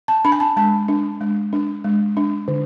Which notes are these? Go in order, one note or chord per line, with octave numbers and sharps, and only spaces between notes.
A5
D4 B5
G#5
A5
G#3 A5
D4
G#3
D4
G#3
D4
D3